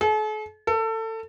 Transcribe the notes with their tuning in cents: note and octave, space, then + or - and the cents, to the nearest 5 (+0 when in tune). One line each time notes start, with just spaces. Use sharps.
A4 -45
A4 +25